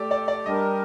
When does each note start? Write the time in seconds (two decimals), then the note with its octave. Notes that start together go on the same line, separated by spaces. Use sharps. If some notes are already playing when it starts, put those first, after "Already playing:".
Already playing: A3 G4 A4 D5
0.11 D5
0.28 D5
0.46 G3 D4 G4 A#4 D#5